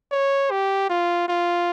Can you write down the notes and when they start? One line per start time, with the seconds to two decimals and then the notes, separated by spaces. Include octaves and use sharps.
0.12 C#5
0.51 G4
0.90 F4
1.29 F4